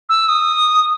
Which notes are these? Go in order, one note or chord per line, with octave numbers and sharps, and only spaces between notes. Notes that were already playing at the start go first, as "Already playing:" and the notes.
E6
D#6